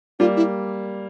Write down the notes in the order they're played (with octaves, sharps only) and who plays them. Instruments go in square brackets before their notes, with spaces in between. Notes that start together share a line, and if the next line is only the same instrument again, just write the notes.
[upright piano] G3 A#3 [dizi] F4
[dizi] E4